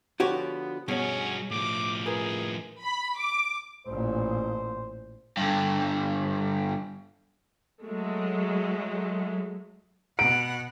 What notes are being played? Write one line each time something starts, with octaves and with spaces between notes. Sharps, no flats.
D3 F3 B3 F#4 G4 C5 C#5
G2 B2 C#4 F#4 G#4 C#5
A2 F3 D6
F4 G#4 A#4 B4
B5
D6
A1 A#2 C5
G2 D3
F#3 G#3 A3
B2 F#5 D7